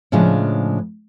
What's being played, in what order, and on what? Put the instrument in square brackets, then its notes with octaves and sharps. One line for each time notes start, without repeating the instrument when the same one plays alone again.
[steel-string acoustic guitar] A2 C#3 F3 G#3 D4